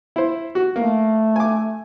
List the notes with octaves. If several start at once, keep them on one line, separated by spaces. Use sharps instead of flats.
E4 C5
F#4
A3 A#3
G#5 D6